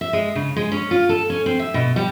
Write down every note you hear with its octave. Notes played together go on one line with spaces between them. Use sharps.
E5
G#3
C#3
G#3
C#4
F4
A4
C#4
C4
E5
B2
G3